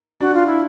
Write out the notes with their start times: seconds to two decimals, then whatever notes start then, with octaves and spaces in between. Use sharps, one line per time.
0.21 D4 F#4
0.34 F4
0.47 E4